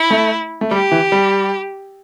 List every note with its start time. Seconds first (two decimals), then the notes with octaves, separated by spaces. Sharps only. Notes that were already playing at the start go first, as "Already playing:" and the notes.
Already playing: E4
0.11 A3
0.61 A3
0.71 G3 G4
0.92 E3
1.12 G3